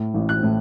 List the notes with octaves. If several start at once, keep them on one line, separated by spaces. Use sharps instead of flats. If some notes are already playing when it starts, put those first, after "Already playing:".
Already playing: A2
A1
F#6
A2